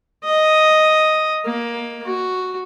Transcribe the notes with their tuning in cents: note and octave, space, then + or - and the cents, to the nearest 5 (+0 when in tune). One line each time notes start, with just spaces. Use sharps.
D#5 +5
A#3 +15
F#4 +0